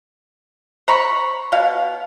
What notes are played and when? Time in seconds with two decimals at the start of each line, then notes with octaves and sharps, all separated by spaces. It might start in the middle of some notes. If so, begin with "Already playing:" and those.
0.88 C5 A#5 B5 C#6
1.52 B2 F5